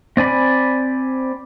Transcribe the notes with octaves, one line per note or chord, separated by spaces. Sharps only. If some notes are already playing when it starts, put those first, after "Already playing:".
C4 D5 G#5 B5